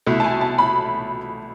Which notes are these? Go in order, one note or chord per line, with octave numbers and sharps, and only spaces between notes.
C2 B2 A3 E4 E5
A5
G#5
A5
B5